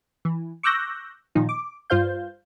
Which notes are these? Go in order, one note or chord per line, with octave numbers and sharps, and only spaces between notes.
E3
C#6 D6 E6 F#6 G6 A#6
A#2 D#3 F3 D#4
D6
G2 F4 C5 F5 G6